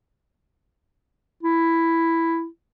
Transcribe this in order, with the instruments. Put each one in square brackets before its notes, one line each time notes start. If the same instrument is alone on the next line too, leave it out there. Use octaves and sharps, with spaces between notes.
[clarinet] E4